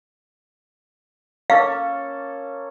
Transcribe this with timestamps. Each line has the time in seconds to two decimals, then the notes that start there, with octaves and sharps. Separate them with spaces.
1.50 A#3 C#4 A4 F5